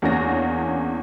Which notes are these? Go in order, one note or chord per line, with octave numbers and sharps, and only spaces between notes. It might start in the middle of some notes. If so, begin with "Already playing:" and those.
E2 A#3 C#4 D4 A#6